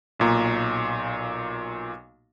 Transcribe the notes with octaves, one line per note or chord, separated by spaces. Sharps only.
B1 A#2 A#5